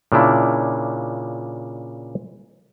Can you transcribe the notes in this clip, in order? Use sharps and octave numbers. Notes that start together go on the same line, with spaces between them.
A#2 C#3 D4 E4